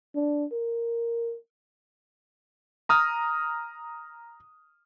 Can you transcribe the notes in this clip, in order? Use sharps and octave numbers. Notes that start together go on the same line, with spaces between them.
D4
A#4
A#5 D#6 F6